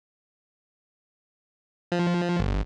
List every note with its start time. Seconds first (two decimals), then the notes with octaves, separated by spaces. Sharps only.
1.92 F3
2.39 G1